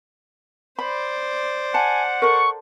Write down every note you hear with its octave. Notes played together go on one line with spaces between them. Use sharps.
C5 D5 B5
F#5 G#5 A5
A4 A#4 C#6